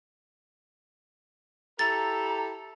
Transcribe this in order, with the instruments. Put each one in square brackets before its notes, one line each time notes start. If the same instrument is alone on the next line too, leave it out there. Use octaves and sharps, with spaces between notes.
[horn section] E4 G4 A4 [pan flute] A#5 [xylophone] A6